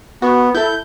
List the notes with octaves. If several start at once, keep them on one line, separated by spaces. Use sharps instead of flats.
B3 F#4
E4 A4 G6